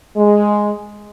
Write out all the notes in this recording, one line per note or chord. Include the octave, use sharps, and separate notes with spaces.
G#3